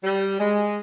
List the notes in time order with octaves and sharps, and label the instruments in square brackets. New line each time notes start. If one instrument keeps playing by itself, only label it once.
[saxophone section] G3
G#3